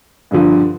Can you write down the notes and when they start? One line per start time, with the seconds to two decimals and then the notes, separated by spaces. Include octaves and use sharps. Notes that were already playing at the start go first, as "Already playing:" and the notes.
0.31 G2 D3 F3